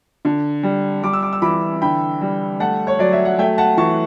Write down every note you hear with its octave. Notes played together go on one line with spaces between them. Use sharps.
D3
G3
G3 D6
E6
D6
E6
E3 B5 D6
D3 G5 B5
G3
A3 F#5 A5
C#5
F#3 D5
E5
F#5
A3 E5 G5
F#5 A5
E3 A5 C#6